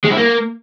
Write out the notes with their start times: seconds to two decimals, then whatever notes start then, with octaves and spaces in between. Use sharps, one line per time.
0.05 G#3
0.11 E4
0.17 A#3